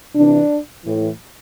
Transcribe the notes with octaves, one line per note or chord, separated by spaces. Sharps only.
C3 E3 D4
A2 E3